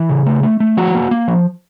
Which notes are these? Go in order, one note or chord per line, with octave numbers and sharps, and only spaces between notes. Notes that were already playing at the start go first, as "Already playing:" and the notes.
Already playing: E3
C#3
A3
A3
A3
F3 F#4 F#5
A#3
A#3
F3